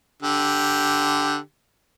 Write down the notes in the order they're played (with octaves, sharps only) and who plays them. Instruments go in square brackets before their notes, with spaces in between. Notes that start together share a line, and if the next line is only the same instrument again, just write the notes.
[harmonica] D3 G4